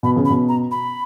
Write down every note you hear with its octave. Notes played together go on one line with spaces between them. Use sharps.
B2 B5
C#3
B5
B2
A#5
B5